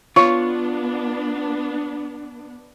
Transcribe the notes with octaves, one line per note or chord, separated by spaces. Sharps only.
B3 D4 F4 C#5 C#6